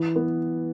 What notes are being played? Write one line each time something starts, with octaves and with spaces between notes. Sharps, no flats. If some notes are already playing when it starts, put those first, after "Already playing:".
Already playing: E3
B3